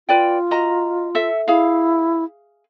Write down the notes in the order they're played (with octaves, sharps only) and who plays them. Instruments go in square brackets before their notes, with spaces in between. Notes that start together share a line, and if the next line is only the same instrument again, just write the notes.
[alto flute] F4 [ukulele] B4 D5 G5
[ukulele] F#4 D#5 A#5
A4 E5
[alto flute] E4 [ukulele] G#4 F5